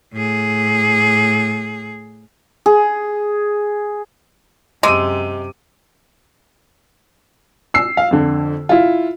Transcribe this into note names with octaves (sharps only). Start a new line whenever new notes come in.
A2 G#4
G#4
F#2 C3 G#3 D6 E6 D#7
E6 C7
F5
F2 D3
E4 F4